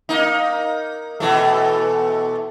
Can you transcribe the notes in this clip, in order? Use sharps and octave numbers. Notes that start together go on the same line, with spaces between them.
A#3 D#4
B2 E3 A3